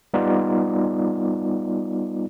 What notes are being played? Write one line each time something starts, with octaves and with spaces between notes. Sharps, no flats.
G3 B3 D#4 F4 D5